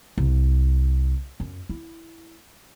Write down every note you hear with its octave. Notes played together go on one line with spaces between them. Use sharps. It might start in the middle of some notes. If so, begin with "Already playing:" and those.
C2
F#2
E4